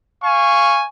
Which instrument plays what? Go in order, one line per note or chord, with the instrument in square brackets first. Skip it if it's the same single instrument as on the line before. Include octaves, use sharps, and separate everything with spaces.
[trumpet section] F5 G#5 C#6